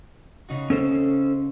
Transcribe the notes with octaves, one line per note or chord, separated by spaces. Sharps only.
C#3 D#4 F#4
C#4 A4 C5